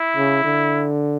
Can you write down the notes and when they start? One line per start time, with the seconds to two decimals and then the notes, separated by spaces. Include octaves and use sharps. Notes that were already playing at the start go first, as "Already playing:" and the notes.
Already playing: E4
0.16 C#3
0.44 D3